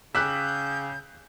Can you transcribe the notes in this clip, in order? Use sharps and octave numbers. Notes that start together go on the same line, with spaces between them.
C#3 G5 D6 E6 F#6 G6 B6